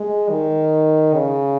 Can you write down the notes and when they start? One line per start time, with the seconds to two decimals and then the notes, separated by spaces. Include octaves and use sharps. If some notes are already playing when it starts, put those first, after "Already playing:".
Already playing: G#3
0.30 D#3
1.14 C#3